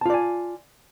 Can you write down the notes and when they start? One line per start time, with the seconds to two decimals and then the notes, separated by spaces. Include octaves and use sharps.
0.01 A5
0.06 F4
0.10 D5
0.14 G#5